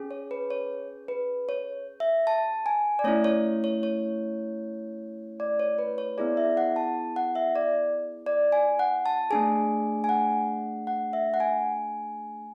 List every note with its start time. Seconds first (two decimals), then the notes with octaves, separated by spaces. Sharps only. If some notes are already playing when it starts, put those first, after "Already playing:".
Already playing: C#4 G#4
0.11 C#5
0.31 B4
0.50 C#5
1.08 B4
1.49 C#5
2.00 E5
2.27 A5
2.66 G#5
2.99 D5
3.04 A3 C#4 E4 C#5
3.24 C#5
3.64 C#5
3.83 C#5
5.40 D5
5.60 C#5
5.78 B4
5.98 C#5
6.18 B3 E4 G#4 D5
6.37 E5
6.57 F#5
6.76 A5
7.16 F#5
7.35 E5
7.55 D5
8.26 D5
8.52 G#5
8.79 F#5
9.06 A5
9.30 A3 D4 G#4 G#5
10.04 G#5
10.09 F#5
10.87 F#5
11.13 E5
11.34 F#5
11.40 G#5